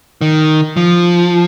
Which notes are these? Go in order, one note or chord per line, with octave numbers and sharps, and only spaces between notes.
D#3
F3